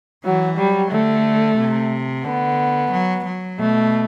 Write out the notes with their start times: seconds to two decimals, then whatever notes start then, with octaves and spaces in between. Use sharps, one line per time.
0.25 E3 F#3
0.58 F#3 G3
0.91 D3 A3
1.59 C3
2.25 D3 B3
2.92 F#3
3.26 F#3
3.59 B2 A3